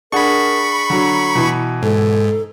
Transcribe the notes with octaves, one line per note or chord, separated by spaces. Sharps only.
D4 G#4 A#4 F#5 B5 C#6
D3 F#3 A#5
B2 E3
G#2 A4